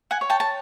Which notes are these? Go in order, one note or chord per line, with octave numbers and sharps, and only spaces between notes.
F#5 G#5
C#5
G5 A5
A5